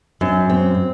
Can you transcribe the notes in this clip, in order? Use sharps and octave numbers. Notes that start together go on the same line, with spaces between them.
F#2
C4